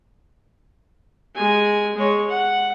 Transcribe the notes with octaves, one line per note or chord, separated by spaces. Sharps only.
G#3 G#5
G#3 C#5
F#5